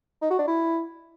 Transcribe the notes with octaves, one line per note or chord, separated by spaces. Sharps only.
D#4
F#4
D4
E4